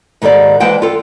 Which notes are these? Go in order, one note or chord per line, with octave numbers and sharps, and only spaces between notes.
G#2 D#3 G3 A4 D5
E3 G#3 C5 F#5 G5 A5
F4 A4